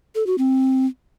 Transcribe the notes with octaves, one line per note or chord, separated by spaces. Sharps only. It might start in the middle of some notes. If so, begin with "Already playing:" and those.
A4
F#4
C4